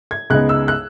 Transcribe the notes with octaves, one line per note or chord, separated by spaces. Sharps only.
G#6
C#2 C#3 G#3 B3 D#4 F#6
E6
F#6